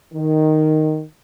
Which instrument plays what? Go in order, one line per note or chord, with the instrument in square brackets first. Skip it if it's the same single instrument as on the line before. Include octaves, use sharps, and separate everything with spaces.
[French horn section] D#3